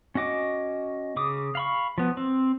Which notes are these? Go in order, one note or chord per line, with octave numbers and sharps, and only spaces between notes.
C#4 F#4 D#5 D6
C#3 D6 D#6
F5 B5 C#6
F3 B3
C4